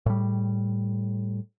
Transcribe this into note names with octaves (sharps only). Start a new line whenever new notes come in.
A2 G3